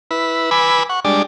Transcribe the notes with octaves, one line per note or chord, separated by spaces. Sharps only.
E4 B4
B4 G#5 B5 D6 E6
F#5 C#6
G3 G#3 D4 D5